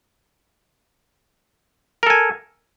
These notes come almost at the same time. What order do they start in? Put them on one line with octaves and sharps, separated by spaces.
A#4 A4 G#5